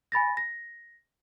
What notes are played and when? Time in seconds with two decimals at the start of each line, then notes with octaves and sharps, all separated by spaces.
0.12 G#5 B5 A6 A#6
0.37 A#6